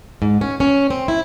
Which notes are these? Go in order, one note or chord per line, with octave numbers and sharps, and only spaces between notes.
G#2
C#4
C#4
C4
E4